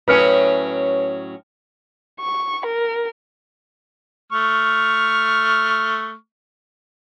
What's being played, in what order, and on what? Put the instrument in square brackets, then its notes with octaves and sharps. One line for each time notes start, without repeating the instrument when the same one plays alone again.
[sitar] A2 F#3 C#4 [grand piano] B4 F6 C#7
[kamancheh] C#6
A#4
[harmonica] A3 C#6 F6